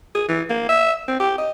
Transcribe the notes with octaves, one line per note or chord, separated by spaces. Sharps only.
G#4
E3
A#3
E5
C4
G4
D#5